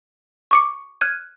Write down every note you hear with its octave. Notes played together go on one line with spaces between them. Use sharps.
C#6 D6 C#7
F6 F#6 G#6 D#7